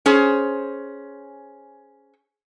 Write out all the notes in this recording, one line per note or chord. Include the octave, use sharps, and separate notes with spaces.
C#4 G#4 C5